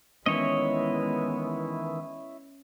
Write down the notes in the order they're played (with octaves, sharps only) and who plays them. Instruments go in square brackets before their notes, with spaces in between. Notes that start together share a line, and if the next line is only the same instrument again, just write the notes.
[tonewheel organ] D#3 E3 [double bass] G#3 B3 [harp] C#4 [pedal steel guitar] E4 C#5 D#5